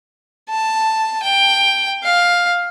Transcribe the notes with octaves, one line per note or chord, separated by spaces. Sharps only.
A5
G5
F5